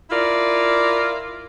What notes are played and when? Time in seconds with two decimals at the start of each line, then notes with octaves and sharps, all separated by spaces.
0.11 E4 F4 A#4 D5